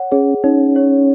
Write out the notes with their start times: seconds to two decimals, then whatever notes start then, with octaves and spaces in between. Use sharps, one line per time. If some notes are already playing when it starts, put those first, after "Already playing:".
Already playing: C#5 F#5
0.12 C#4 G#4
0.44 C#4 D#4
0.76 C#5